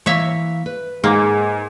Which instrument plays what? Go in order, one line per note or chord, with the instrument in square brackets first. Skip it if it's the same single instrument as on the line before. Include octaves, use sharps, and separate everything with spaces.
[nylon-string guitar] E3 A#3 F5 [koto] C#5 E5
[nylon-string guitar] B4
[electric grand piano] G#2 [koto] A#3 [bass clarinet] G#4